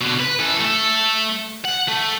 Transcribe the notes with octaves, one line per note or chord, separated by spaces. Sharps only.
B2 D3
B4
E3 A4
A3 A4
F#5
A3